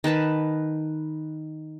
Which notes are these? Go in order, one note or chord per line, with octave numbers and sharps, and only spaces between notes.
D#3 B4 A5 B5